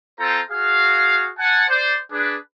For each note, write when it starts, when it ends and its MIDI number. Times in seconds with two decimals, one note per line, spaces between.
0.19 0.40 60
0.19 0.40 65
0.19 0.40 69
0.19 0.40 72
0.19 0.40 79
0.19 0.40 82
0.50 1.28 66
0.50 1.28 68
0.50 1.28 77
1.39 1.65 78
1.39 1.65 80
1.39 1.65 81
1.69 1.96 72
1.69 1.96 74
2.12 2.36 62
2.12 2.36 68
2.12 2.36 71